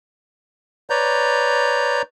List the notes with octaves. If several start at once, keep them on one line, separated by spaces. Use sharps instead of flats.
B4 C#5 D5 A#5 G6